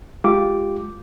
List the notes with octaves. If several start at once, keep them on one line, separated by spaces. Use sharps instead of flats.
G#3 F4 G4 D6